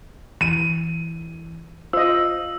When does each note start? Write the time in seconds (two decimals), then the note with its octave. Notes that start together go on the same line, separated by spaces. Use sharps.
0.41 E3 D#7
1.93 F4 C5 D#5 E6